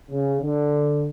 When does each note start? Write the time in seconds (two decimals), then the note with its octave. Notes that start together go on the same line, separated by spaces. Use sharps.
0.10 C#3
0.42 D3